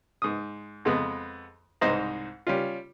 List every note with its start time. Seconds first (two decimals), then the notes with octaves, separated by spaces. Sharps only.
0.22 G#2 D#6
0.85 F2 G#3 B3
1.81 C2 G#2 D#4 C5 A#5
2.47 G3 C#4 F4